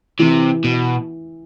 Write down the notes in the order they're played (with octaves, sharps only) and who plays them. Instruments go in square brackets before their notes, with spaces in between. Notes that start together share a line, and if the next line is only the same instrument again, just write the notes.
[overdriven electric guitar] C3 [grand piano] E3
[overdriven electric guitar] B2